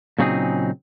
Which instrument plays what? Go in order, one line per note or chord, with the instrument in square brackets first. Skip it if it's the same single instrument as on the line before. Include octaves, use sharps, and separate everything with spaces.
[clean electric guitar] A#2 C#3 F#3 C4 D#4 G#4